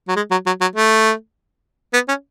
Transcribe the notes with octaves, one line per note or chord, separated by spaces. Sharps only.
F#3
G#3
F#3
F#3
F#3
A3
B3
C#4